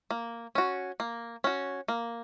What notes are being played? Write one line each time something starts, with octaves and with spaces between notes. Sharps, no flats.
A#3
C#4 F#4
A#3
C#4 F#4
A#3